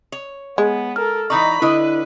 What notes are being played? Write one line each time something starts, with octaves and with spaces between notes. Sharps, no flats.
C#5
G#3 B3
A4 A#4 F6
E3 D#4 D5 A#5 B5 C#6
D3 E4 B4 D#5